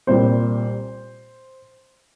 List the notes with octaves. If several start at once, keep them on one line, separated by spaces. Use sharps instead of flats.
C2 A#2 G3 C4 C5